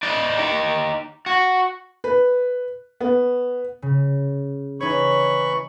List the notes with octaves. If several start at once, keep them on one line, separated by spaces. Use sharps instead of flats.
D#4 D5
D#4 G4
F#4
B4
B3
C#3
E3 D#4 C#5 B5 C#6